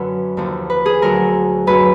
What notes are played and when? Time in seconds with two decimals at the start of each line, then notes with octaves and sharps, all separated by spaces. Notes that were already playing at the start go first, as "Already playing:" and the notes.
Already playing: F#2 D3 F#3 B4
0.37 D#2 D3 F3
0.70 B4
0.86 G#4
1.02 D2 D3 F#3 A#4
1.67 F#2 D3 F#3 B4